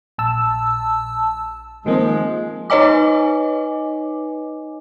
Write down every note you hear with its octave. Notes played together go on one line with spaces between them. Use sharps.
A#1 A5 E6
D#3 F3 G#3 A#3 C4
D#4 B4 C#5 D#5 G#5 D6